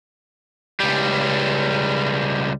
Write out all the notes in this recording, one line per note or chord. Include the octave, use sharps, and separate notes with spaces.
C#2 G3